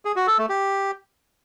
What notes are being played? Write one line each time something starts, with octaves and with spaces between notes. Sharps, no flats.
G#4
F#4
A4
A3
G4